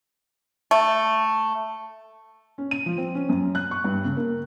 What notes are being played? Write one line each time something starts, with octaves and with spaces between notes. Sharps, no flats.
A3
C#4
D#7
F3
C4
C#4
F#2
F#6
C#6
G2
C#3
A#3